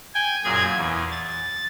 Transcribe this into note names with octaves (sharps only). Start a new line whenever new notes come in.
G5 G#5
F#2 A#2 G#4 G#6
E2
A6